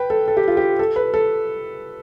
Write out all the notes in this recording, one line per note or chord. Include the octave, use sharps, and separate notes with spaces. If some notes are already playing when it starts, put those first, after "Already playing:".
Already playing: B4 G5
A4
A4
G4
F4
G4
A4
B4
A4